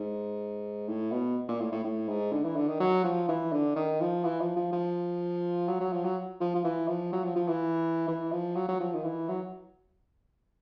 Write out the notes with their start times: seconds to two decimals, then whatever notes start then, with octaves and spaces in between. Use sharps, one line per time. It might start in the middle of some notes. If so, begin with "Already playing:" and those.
Already playing: G#2
0.88 A2
1.12 B2
1.48 A#2
1.60 A2
1.72 A2
1.84 A2
2.08 G#2
2.32 D3
2.44 E3
2.56 D3
2.68 D#3
2.80 F#3
3.04 F3
3.28 E3
3.52 D3
3.76 D#3
4.00 F3
4.24 E3
4.41 F3
4.56 F3
4.72 F3
5.68 F#3
5.80 F#3
5.92 F3
6.04 F#3
6.40 F3
6.55 F3
6.64 E3
6.88 F3
7.12 F#3
7.24 F3
7.36 F3
7.48 E3
8.08 E3
8.32 F3
8.56 F#3
8.68 F#3
8.80 F3
8.94 D#3
9.04 E3
9.28 F#3